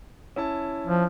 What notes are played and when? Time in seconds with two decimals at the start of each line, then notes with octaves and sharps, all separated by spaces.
0.36 C#4 E4 A5
0.87 F3